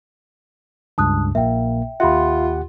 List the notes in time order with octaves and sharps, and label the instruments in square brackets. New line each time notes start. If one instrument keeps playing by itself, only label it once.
[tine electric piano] C#2 G2 [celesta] A5 D#6 F#6
[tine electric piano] A#1 A#2 A#3 [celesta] E5 G5
[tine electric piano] D#2 G4 F#5 [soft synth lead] F4 [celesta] E5 B5